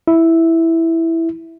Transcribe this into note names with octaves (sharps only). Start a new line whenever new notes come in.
E4